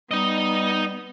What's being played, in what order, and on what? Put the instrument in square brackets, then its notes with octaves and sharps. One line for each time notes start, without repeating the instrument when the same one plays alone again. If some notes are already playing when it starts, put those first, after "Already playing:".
[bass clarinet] G3 [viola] B3 [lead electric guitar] D#4 D#5